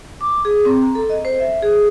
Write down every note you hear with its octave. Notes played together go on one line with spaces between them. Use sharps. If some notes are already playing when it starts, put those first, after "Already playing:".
D6
G#4
C4
A#5
A4
D#5
C5
E5
G#4